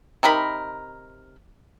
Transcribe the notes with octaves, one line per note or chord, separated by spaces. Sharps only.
C3 D#4 A#4 B5